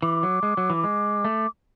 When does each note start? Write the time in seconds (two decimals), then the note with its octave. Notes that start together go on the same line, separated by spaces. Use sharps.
0.02 E3 D6
0.23 F#3
0.43 G#3
0.57 F#3
0.70 E3
0.84 G#3
1.25 A3